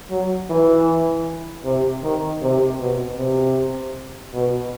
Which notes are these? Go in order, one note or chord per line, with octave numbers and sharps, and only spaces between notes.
F#3
E3
C3
D#3
C3
B2
C3
B2